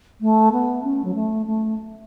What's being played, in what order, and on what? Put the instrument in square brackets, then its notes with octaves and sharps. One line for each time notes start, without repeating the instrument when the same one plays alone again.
[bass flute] A3
B3
C#4
F#3
A3
A3